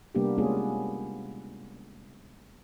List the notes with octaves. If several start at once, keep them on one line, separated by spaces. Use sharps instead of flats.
C3 G3 A#3 B3 D4 G4
G#3 A#3 B3 C#4 F4 G#4